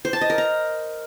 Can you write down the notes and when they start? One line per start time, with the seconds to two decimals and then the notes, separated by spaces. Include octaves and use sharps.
0.05 C5
0.13 A5
0.21 D#5
0.30 A#4
0.38 A#5